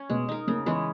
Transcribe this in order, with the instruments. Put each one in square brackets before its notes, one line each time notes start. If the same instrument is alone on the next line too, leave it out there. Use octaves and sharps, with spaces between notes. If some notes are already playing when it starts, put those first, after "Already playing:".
Already playing: [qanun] C#4
[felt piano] B2 [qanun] G#3
[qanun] D#4 A#4
[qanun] C#3 [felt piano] A#3
[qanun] E3 G#3 C#4 [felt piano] B3